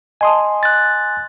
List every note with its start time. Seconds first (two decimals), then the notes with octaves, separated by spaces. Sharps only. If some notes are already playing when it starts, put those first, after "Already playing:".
0.21 D#5 G#5 A5 C6 D#6
0.63 F#6 A6